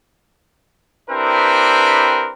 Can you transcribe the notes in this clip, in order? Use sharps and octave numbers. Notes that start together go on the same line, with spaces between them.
C4 D4 E4 G4 A#4 B4